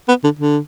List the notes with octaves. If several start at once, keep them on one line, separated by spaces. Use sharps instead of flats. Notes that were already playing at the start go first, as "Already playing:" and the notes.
B3
D3
D3